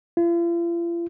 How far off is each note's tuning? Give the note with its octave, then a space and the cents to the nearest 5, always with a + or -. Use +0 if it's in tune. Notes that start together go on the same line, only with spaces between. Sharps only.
F4 -45